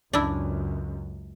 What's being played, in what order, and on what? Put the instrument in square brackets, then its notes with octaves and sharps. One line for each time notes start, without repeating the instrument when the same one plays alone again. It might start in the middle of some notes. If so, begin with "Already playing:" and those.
[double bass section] C#2 F#2 [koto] D4 E4